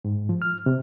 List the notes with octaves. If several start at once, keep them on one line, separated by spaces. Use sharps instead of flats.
G#2
F3
F6
C3